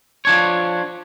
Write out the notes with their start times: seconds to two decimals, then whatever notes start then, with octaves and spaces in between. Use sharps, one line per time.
0.25 F3 D4 C#5